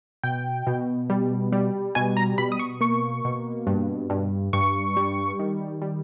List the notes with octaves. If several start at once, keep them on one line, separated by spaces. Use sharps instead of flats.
B2 G5
B2
G3
G3
B2 G#5
A#5
B2 B5
D#6
C#6
A#3 C#6
B2
G2
G2
G2 C#6
G3
D#3
G3